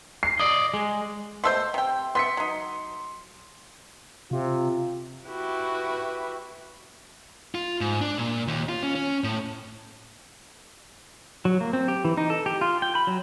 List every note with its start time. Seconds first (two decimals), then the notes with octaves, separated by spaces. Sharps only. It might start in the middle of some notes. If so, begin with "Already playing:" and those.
0.23 C7
0.39 D5 D#5
0.74 G#3
1.44 B2 A3 C5 C6 E6 G6
1.74 C3 G5
2.15 B3 E5 C6 B6 C#7
2.37 F#3 D#4
4.31 C3 F4
5.27 E4 F#4 G4 B4
7.55 F4
7.81 G#2
8.01 D4
8.17 A#2
8.48 D#2
8.69 F4
8.83 C#4
8.95 C#4
9.24 A2
11.45 F#3
11.61 A#3
11.73 C4
11.88 G4
12.05 E3
12.17 D#4
12.30 A4
12.46 G4
12.61 F4
12.82 G5
12.95 B5
13.07 F#3